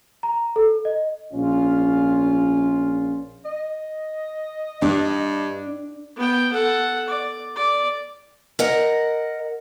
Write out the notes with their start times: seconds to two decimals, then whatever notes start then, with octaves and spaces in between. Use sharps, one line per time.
0.23 A#5
0.56 A4
0.85 D#5
1.33 A#1 C#4 F4
3.45 D#5
4.82 G2 D4
6.16 B3 G5
6.52 A4 F#5
7.08 D5
7.56 D5
8.59 A#4 D#5 F#5